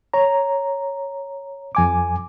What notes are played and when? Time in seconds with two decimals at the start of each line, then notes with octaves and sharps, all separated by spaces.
0.14 C#5 A#5
1.75 F2 G#5 D6